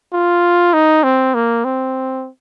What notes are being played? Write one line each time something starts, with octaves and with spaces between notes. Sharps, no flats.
F4
D#4
C4
A#3
C4